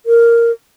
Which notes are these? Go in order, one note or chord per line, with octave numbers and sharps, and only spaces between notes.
A#4